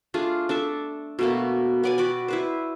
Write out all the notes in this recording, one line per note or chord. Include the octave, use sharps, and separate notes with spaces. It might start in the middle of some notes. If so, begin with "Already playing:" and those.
A3 D4 F4 G#4
D4 A4 E5
B2 A3 A#3
B3 D5 G#5
F#4 D5 G5 B5
E4 B4 C5